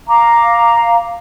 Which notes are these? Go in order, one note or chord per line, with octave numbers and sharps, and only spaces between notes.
F5 A#5 D6